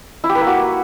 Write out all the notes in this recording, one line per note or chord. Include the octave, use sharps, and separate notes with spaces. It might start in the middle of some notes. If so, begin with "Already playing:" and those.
E4
G4
B4
A#3
F#4